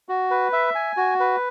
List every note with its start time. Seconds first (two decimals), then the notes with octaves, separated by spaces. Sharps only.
0.09 F#4
0.31 B4
0.53 E5
0.75 G#5
0.97 F#4
1.20 B4